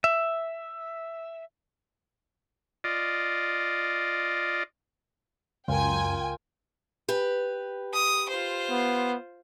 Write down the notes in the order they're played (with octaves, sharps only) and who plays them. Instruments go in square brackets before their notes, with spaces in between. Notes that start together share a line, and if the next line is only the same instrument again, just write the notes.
[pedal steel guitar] E5
[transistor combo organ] F4 D5 D#5
[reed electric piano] C#2 [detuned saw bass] F#2 [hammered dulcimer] F4 A#4 [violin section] G5 G#5
[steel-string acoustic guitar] G4 B4
[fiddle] D#6
F4 C5
[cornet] B3